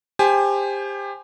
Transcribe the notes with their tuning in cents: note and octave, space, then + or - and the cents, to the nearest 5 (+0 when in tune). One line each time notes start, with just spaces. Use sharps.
G4 +25 C5 +0 G#5 +20